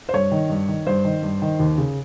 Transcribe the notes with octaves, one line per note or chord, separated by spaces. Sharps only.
C5
G2 C#5
D#3
G2
D#3
G2 C5
D#3
G2
D#3
D#2
C#3